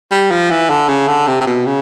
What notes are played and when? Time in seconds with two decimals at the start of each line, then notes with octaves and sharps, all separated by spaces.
0.12 G3
0.31 F3
0.51 E3
0.70 D3
0.89 C#3
1.08 D3
1.27 C3
1.41 C3
1.47 B2
1.66 C#3